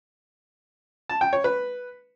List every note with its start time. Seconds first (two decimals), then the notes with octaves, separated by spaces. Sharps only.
1.09 A5
1.21 G5
1.33 C#5
1.44 B4